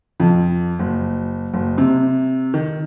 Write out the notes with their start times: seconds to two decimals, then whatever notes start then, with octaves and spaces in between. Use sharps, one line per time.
0.20 F2
0.79 F#1
1.54 F#1
1.78 C3
2.54 D#3